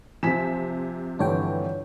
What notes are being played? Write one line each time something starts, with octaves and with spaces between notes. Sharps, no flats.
C3 F3 G#5 B6 E7
G2 D3 E3 D4 C#5 G5